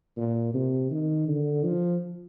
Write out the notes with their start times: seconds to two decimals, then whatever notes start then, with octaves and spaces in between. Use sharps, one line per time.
0.17 A#2
0.54 C3
0.91 D#3
1.28 D3
1.64 F3